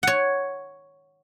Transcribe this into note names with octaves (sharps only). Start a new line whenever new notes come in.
C#5 F#5